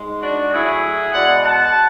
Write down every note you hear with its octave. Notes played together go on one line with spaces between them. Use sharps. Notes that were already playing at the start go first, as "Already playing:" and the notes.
Already playing: G#2 G#3
D4 F#4
A2 F#3 E4 G#4
B2 G#3 D5 F#5
F#5 A5